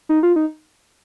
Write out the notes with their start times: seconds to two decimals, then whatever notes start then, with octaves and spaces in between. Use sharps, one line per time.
0.09 D#4
0.23 F4
0.36 D#4